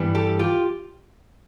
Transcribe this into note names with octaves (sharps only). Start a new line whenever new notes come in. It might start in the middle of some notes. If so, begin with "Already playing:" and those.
Already playing: G2 E3 G3 B3
G4 A4
F4 G4